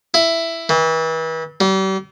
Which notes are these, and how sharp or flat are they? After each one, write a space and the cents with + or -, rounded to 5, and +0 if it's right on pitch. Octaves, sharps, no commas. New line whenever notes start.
E4 +10
E3 -35
G3 -40